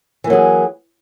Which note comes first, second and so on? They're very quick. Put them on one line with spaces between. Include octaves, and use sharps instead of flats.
E3 A#3 F#3 G#4